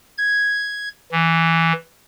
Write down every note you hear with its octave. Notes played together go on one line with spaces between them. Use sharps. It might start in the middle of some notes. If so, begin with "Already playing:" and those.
G#6
E3